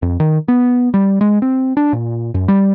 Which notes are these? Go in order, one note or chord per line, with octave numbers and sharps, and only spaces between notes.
F2
D#3
B3
G3
G#3
C4
D4
A#2
F#2
G3